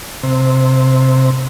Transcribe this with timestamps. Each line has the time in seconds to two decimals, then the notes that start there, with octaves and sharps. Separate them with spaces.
0.23 C3